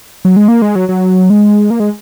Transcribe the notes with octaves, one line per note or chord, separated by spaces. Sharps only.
F#3
G#3
A#3
G#3
F#3
F#3
G#3
A#3
G#3